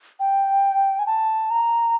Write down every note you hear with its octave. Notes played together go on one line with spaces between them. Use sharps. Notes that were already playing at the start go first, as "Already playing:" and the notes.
G5
G#5
A5
A#5